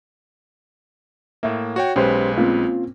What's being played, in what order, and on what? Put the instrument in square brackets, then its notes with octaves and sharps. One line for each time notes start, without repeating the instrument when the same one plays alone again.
[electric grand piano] A2 A#3 [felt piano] E5
[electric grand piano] F#4 C#5 G5
[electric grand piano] B1 G#3 B4 [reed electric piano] C#4 G4 C5
[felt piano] A#3 C4 C#4 [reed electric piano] F4